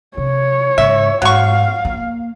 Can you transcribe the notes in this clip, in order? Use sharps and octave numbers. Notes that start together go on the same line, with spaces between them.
C3 C#5
G#2 C#3 E5
G#2 F#3 F5 C#6
A#3